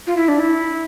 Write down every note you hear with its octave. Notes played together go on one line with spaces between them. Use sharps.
F4
E4
D4
E4